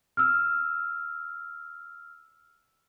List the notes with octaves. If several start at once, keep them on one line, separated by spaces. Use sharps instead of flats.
E6 F6